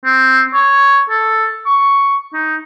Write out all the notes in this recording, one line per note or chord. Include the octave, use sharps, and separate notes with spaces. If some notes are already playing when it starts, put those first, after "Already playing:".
C4
C#5
A4
C#6
D#4